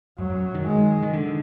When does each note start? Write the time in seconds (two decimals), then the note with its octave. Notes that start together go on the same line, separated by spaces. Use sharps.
0.18 F#2 F#3
0.30 F#2
0.54 D#3
0.65 G#3
1.03 D#3
1.13 D3